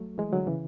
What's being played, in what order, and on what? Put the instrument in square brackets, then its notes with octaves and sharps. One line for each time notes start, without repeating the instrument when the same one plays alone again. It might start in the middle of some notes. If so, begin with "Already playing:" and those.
Already playing: [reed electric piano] F#3 A3
E3 G#3
D3 F#3
C#3 E3